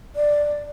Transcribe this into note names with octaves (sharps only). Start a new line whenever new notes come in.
D5